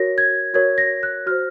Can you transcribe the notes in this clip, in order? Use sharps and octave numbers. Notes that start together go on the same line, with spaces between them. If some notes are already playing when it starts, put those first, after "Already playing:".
Already playing: F#4 A#4 C#5 A#6
G#6
F#4 A#4 C#5 G#6
A#6
F#6
F#4 C5 F6